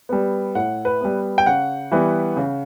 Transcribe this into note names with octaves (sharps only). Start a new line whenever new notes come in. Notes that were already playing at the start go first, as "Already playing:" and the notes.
G3 B3
A2 F#5
B4
G3 B3
G5
C#3 F#5
E3 G3 B3
C#3